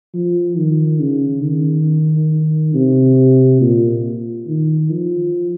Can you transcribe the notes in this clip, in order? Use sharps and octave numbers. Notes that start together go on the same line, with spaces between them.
F3
D#3
C#3
D#3
C3
A#2
D#3
F3